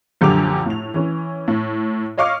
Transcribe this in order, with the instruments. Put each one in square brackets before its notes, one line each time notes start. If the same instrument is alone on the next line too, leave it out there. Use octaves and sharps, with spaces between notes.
[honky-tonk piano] A#1 F#2 D3 G4 D6 F7
A2 F7
E3 C#4
A2
C#5 D#5 F5 C#6 D6 F6